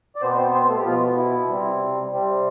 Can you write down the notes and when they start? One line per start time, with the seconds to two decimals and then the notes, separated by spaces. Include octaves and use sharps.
0.16 D5
0.22 B2 B3 C4 C5
0.37 C4 C5
0.53 C4 C5
0.69 A3 A4
0.79 G4
0.84 B2 F3 B3 F4
1.17 E4
1.48 C3 G3 C4
2.11 C3 G3 C4